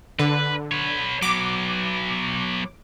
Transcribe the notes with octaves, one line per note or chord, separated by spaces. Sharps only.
D3 B4
B4 C#5
F#3 B3 D6